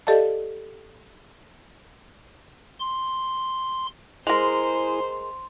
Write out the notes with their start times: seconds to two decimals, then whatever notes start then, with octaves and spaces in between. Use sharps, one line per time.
0.07 G4 A4 D5 D#5 F5 A5
2.80 C6
4.27 G#3 E4 G#4 A#4 C5 G#5 C6 F7